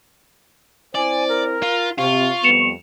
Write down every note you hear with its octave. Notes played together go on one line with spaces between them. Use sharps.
C4 E4 C5 D5 G#5
A#4
F4
C3 F4 C#6
F2 G3 B3 C#7 E7 F7